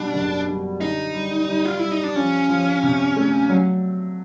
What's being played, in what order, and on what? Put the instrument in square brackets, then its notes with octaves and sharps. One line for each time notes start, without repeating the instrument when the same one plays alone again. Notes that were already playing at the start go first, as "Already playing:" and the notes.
Already playing: [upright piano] B2 G3 [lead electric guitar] D4
[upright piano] F#1
G3
[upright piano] D3 [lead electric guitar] D#4
[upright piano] G3
G3
[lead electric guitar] F4
[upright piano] G3 [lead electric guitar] E4
[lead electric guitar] D#4
D4
[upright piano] F3 [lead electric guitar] C#4
[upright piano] F3
C3
A3
F#3